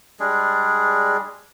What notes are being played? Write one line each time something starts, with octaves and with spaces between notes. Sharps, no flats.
G3 G#3 D4 G#4